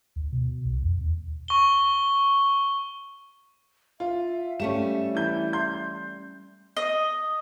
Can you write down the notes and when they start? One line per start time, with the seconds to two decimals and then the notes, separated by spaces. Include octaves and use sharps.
0.16 D2
0.33 B2
0.65 C2
0.82 F2
1.01 D#2
1.48 C#6 G7
4.00 F4 E5
4.60 G3 A3 C#4 E7
5.15 E3 G6
5.53 C6 G6
6.77 D#5